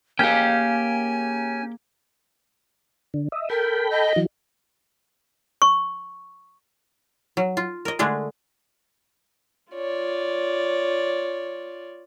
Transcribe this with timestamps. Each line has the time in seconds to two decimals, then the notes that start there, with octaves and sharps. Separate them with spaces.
0.19 A#3 C#4 G4 G#4 A#4 F5 G5 G#5
3.14 D3
3.32 D#5 E5
3.50 A4 A#4 G5 B5
3.90 D#5
4.16 E3 F#3
5.62 C#6
7.37 F#3
7.57 F4
7.85 A#4 D#5
7.99 D3 G#3 A3 D4 G#4
9.72 F4 C#5 D5